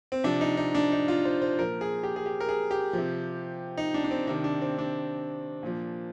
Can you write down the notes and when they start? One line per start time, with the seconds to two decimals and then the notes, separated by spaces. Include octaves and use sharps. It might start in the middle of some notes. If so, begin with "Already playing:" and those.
0.12 C4
0.24 C3 F3 D4
0.41 D#4
0.57 D#4
0.75 D4
0.92 D#4
1.08 F4
1.25 C5
1.42 C5
1.59 A#2 F3 A#4
1.81 G#4
2.03 G4
2.16 G#4
2.26 G4
2.41 A#4
2.49 G#4
2.71 G4
2.93 C3 F3
3.77 D#4
3.94 D4
4.04 D4
4.11 C4
4.27 C3 D#3 D4
4.44 D4
4.62 C4
4.78 D4
5.63 A#2 F3